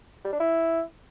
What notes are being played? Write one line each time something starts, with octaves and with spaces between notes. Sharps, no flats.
G3
D4
E4